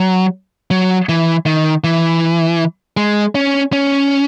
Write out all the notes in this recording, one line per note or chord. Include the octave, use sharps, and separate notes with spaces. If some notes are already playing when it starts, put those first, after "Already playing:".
Already playing: F#3
F#3
E3
D#3
E3
G#3
C#4
C#4